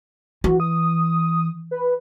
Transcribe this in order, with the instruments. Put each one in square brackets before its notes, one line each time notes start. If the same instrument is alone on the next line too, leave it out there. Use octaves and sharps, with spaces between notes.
[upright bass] E3 [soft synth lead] F#4
[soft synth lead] D#6
B4